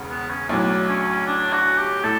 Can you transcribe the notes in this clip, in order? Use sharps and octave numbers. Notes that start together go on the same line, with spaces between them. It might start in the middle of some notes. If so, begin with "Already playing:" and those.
Already playing: E1 E2 C#3
B3
C#4
B1 A2 F#3 D4
C#4
D4
F#4
G4
A2 A4